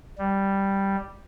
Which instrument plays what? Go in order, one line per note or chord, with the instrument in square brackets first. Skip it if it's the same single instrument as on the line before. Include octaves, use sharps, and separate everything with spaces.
[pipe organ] G3